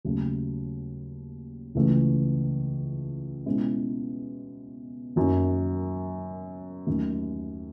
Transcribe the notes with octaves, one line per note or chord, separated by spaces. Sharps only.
D#2 C#3 F#3 A3
C#2 C#3 E3 A3
B2 G#3 C#4 E4
F#2 D#3 F#3 A#3
D#2 D#3 F#3 A3 C#4